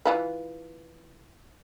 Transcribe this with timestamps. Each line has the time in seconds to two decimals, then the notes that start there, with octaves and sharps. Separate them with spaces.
0.05 E3 F4 B4